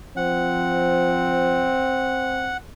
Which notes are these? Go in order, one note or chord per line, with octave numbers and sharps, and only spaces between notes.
F3 C4 F#5